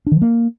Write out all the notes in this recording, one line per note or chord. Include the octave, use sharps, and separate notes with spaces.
D4
D#3
F3
A#3